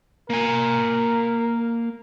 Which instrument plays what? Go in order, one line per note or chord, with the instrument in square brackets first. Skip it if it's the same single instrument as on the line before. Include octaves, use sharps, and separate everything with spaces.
[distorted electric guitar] A#3 G#5 [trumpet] A#4